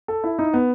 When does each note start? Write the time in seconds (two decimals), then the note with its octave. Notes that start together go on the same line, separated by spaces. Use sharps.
0.08 A4
0.24 E4
0.39 D#4
0.54 B3